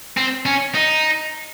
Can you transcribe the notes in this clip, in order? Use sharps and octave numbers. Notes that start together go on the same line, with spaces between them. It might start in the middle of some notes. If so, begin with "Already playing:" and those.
C4
C#4
D#4